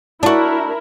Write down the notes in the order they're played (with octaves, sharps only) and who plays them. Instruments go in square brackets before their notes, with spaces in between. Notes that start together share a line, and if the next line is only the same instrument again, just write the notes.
[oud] D4 F#4 [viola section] E4 A#4